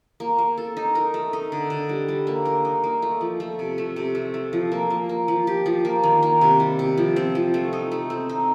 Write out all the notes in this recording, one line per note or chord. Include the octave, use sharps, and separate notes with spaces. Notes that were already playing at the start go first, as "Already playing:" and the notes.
A#3
A#3
A4
D#4
A#4
A3
D#4
D3
D3
G3
G3
A#3
A#4
D#4
A#3
A3
F3
A3
C3
A3
C3
A3
A3
F3
A#3
A#3
A#3
F3
G4
F3
A#3
D#3
A#3
C3
G3
C3
F3
C4
F3
A3
D#4
A3
C4
D#4